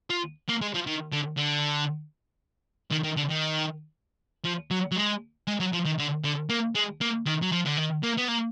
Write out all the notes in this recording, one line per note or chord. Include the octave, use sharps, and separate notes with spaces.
F4
A#3
G#3
F3
D#3
D3
D3
D#3
D#3
D3
D#3
F3
F#3
F#3
G#3
G#3
F#3
F3
D#3
D3
D3
A#3
G#3
A#3
D#3
F#3
F3
D3
D#3
A#3
B3
A#3